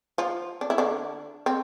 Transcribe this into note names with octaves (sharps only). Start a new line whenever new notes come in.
F3 F4
D4
E4
D3 D4
C4